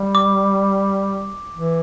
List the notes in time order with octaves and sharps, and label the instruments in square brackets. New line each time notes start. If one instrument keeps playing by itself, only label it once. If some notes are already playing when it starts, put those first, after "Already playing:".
Already playing: [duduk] G3
[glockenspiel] D6
[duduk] E3